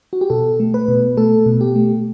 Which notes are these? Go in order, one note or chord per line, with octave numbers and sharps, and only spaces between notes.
F#4
G4
B2 A4
A3
B4
B2
A3 A4
B2
G4
A3